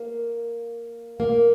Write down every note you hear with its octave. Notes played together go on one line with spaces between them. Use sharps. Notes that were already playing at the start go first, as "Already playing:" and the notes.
Already playing: A#3
A#3